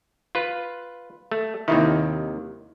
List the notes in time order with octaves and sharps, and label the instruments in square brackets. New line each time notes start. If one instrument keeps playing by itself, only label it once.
[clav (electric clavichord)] F4 B4
A3
[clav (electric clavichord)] D#2 C3 D#3 [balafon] E4 E5